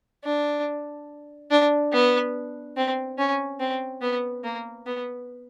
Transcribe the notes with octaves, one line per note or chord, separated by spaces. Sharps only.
D4
D4
B3
C4
C#4
C4
B3
A#3
B3